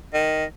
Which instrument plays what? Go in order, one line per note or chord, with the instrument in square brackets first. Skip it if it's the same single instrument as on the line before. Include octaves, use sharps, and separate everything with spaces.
[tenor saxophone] D#3